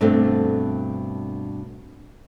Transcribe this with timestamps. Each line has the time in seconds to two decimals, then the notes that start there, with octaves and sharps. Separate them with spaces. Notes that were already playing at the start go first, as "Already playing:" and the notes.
0.01 G2 B2 A3 B3 C4 D4